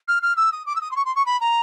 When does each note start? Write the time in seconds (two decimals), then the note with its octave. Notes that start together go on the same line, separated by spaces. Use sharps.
0.08 F6
0.22 F6
0.37 E6
0.52 D#6
0.66 D6
0.76 E6
0.81 D#6
0.91 C6
0.96 C#6
1.05 C6
1.16 C#6
1.26 B5
1.41 A#5